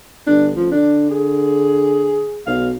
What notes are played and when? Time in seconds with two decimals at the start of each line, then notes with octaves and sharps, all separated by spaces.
0.27 G1 D4
0.56 A1 F3
0.72 D3 D4
1.10 G#4
2.47 B1 F5